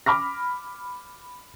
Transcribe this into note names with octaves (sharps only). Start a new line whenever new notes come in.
B5 D6 F6 A#6